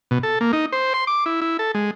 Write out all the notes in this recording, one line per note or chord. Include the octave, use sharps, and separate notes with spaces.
B2
A4
A#3
D#4
C5
C6
D6
E4
E4
A4
G#3